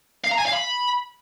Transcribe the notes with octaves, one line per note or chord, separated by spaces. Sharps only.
F5
A#5
G#5
F5
B5